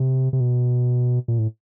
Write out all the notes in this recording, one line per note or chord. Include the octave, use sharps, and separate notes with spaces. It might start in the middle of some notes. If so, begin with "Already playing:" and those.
Already playing: C3
C3
B2
A#2
A2